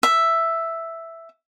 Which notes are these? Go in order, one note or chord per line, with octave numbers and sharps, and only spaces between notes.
E5